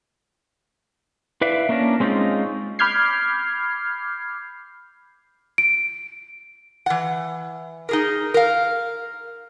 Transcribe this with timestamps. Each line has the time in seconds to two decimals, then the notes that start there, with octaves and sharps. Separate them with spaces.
1.41 E4 B4 D5 E5 F5
1.69 A#3 C#4 D4 A4 A#4
2.00 G#3 C4 C#4 D#4 F4
2.79 B5 D6 F6 G6 G#6 C7
5.58 D7
6.86 E3 F#5
7.89 D#4 G#4 A#4
8.34 A#4 F5